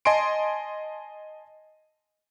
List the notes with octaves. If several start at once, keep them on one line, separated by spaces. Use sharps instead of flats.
D#5 G#5 A5 C6 D7